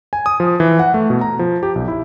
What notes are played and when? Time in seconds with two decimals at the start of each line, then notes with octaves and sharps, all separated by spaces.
0.13 G#5
0.26 D#6
0.40 F3
0.60 E3
0.79 F#5
0.94 A3
1.10 B2
1.21 A#5
1.39 F3
1.63 G4
1.75 B1
1.88 E4